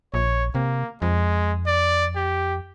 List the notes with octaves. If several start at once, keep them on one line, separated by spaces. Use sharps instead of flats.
A#1 C#5
C3 A#3
F2 G#3
D5
G4